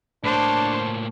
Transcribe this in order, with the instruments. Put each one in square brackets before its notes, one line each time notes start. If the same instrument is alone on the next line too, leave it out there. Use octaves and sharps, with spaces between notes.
[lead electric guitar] A2 A#3 [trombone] D4 [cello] C5 [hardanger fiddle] C#5 A5